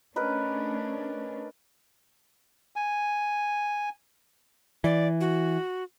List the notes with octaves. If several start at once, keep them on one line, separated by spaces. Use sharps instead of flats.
A3 C#4 D4 A#4 B4 D#5
G#5
E3 D5
F#4